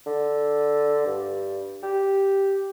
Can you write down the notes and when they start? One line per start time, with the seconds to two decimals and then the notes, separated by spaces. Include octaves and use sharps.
0.06 D3
1.06 G2
1.83 G4